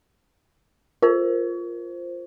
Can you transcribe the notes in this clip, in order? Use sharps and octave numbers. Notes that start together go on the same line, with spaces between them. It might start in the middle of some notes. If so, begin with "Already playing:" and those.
F4 A#4 C5